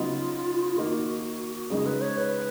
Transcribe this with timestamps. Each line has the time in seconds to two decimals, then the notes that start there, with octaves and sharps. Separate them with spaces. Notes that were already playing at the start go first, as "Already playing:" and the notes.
Already playing: C#3 F#3 B3 D#4 F4
0.76 D#3 A#3 D#4 F#4 G#4
1.70 C#3 G#3 D#4 G#4
1.86 B4
2.01 C#5
2.17 B4